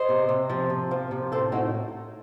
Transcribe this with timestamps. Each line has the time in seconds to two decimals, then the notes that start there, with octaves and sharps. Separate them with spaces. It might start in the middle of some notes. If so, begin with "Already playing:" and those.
Already playing: C5 D#5
0.09 C3
0.29 C3
0.50 F3
0.70 C3
0.91 F3
1.11 C3
1.32 A2 A4 C5
1.52 A2 D#4 F#4